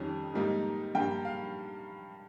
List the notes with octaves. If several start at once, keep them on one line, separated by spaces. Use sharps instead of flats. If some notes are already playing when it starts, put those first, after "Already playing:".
Already playing: F2 D#3 G3 C#4
G#2 G3 A#3 D#4
G2 G3 A#3 G5
F5